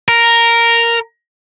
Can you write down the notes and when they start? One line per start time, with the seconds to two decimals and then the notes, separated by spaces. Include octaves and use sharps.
0.08 A#4